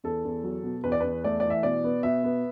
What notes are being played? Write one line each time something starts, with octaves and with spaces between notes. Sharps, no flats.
E2 A4
E2
F#3
B2
E2 B4
D5
E2 B4
A3 D5
E3 D5
E5
B2 D5
B3
B2 E5
B3